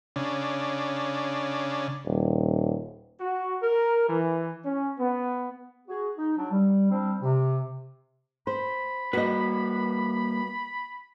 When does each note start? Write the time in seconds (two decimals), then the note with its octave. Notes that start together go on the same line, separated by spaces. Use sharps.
0.16 C#3 D4
2.06 D#1
3.20 F#4
3.63 A#4
4.08 E3
4.65 C#4
4.99 B3
5.88 F#4 G#4
6.17 D#4
6.37 F#3 D4
6.51 G3
6.91 F3 G3 C4 D4 C5
7.21 C3
8.47 C5 B5
9.13 G3 A#3 F#4 B4 D#5